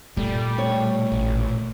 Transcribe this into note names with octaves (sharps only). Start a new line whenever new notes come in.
A#2 G3 A3
C#5
A1